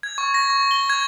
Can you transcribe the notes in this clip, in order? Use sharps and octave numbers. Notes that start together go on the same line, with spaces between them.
G#6
C#6
A#6
C#6
G7
G#6